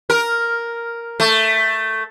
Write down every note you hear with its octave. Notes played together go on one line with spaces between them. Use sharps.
A#4
A3